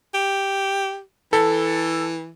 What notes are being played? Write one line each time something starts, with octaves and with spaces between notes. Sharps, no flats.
G4
E3 A4